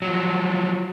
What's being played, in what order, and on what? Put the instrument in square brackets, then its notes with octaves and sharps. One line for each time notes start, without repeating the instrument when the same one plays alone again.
[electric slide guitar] F3 F#3